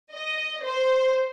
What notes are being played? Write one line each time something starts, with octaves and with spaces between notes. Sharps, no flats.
D#5
C5